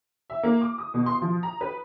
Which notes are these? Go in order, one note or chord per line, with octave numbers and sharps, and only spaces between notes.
E5
A#3
D6
D#6
B2
C6
F3
A#5
B4